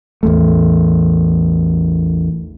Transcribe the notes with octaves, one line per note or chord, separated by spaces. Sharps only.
A1 E2 A3